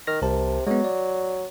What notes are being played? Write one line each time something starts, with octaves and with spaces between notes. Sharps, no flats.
D#3 F6 A#6
C2 C3 A#4 A5
F#3 G#3 B3
D5